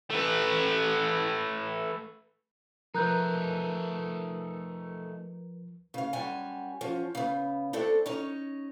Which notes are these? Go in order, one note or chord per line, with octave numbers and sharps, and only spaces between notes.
A3 B4
F3 A3 D#4 A#4 B4 A#5 F#6 G6
C#3 F5
F#2 G3 F#4 G#5
F3 C#4
C#3 B3
A3 C4 D4 A4
C#4 D#4 C#5